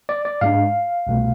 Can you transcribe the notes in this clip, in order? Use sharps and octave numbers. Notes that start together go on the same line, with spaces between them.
D5
D5
G#2 G#3 D4 F5
C2 B2 A3